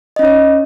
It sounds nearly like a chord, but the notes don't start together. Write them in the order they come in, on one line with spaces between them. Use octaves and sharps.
D#5 C#4 D#4 C#5